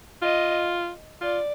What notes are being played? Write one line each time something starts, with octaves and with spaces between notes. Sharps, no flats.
F4 D#5
F4 D5